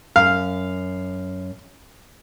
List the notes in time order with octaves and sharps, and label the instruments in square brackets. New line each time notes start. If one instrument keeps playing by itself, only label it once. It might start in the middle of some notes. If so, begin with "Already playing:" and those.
[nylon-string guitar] F#2 [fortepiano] F5